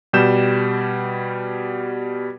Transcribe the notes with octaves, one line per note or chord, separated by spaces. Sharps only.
B2 G3 G6 E7